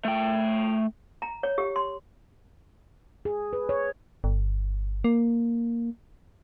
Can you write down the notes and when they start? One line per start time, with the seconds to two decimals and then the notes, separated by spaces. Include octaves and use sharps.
0.05 A3 G5
1.22 A#5
1.43 C#5
1.58 G4
1.76 C6
3.25 G#4
3.53 B4
3.69 C#5
4.24 G1
5.04 A#3